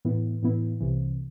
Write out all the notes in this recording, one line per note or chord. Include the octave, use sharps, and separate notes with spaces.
A2 E3 B3 E4
A2 E3 B3 E4
C2 C3 E3